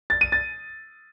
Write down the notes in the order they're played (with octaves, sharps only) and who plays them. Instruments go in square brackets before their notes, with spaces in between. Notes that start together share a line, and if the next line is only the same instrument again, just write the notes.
[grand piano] A6
D#7
A6